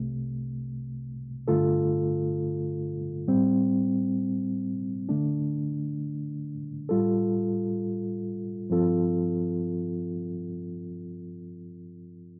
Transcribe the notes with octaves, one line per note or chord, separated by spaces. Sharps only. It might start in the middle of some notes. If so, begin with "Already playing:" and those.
Already playing: C2 C3 A3
G2 D3 A3 F4 A4
A2 G3 C4
D3 A3 D4
A2 G3 F4 A4
G2 F3 C4 F4 A4